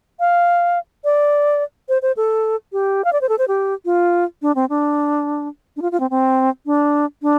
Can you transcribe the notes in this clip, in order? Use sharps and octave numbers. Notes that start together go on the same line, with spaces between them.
F5
D5
C5
C5
A4
G4
F5
D5
C5
A4
C5
G4
F4
D4
C4
D4
D4
F4
F4
C4
C4
D4
D4